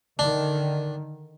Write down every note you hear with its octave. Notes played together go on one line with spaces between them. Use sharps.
D3 D#3 D4